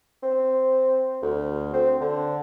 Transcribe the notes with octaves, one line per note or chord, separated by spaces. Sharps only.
C4
D2
C4
D3